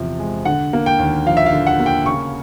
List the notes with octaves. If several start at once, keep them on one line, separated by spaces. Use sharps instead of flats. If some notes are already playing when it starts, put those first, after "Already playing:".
Already playing: E2 C3 F3
G#3
D3 F#5
A#3
G5
D#2
F3 F5
E5
F5
D3
F#5
A#3
G5
C#3 C#6